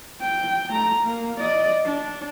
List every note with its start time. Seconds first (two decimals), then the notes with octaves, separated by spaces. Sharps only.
0.21 G5
0.70 A3 A#5
1.02 A#3
1.40 D5 D#5
1.85 D4